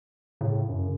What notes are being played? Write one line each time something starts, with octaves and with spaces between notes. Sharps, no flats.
A2 C#3
F#2